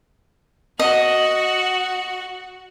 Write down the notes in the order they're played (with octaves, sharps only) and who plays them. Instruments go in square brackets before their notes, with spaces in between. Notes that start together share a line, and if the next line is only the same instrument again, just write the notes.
[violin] F#4 F#5 [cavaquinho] D#5